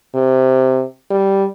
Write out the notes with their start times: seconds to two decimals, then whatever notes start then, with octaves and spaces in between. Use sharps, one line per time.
0.15 C3
1.10 G3